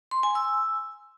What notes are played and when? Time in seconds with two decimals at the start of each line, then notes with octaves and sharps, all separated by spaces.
0.11 C6
0.23 G#5
0.35 E6